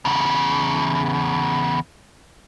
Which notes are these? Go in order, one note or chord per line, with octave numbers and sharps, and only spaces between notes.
E2 C#3